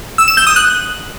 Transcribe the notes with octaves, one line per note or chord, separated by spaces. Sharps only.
E6
E7
G6
D#6
F#6